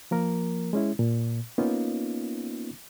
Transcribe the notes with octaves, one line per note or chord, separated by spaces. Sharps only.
F3 A#3 A#4
G#3 C#4 E4
A#2
A#3 B3 C#4 D#4 F4